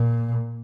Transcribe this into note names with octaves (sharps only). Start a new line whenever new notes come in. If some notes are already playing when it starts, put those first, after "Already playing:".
Already playing: A#2